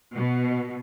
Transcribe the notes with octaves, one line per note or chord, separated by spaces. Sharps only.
B2